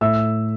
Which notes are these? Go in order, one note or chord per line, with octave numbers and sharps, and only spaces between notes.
A2 E5 E6